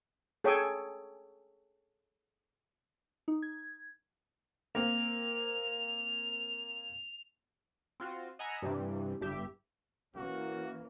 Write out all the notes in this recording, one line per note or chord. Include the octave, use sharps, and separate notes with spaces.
G#4 A4 C#5 G5 G#5
D#4
G#6
A#3 C4 F7
C4 F4 F#4
D#5 F#5 G#5 A#5 B5 E6
G2 C3 E3 G3
G1 G2 G4 E5
E3 A#3 C#4 F#4